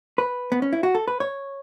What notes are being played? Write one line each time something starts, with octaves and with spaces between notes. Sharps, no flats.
B4
B3
C#4
E4
F#4
A4
B4
C#5